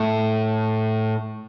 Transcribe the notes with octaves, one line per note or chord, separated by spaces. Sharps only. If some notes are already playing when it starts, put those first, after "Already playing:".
Already playing: A2